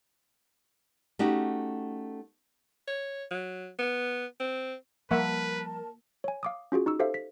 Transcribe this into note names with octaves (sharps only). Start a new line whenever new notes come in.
A3 C#4 D#4 F#4 G4
C#5
F#3
B3
C4
F3 G3 A#3 A#4 B4 E5 F#5 A5
C#5 G#5
F5 D6 D#6
C#4 F4 F#4 G#4
D#4 C#6 E6
G4 A4 C5 E5 F5
B6